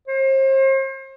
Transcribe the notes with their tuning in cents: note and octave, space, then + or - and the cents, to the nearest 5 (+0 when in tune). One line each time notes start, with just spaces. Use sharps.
C5 +40